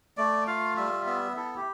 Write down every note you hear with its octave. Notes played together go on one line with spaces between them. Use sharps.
A3 D5
F4 F5
G3 E5
B3 E5
E4 A4
G4